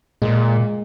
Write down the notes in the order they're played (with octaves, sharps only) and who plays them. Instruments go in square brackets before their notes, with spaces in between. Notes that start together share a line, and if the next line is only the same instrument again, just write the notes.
[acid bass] A#2 [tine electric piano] G#3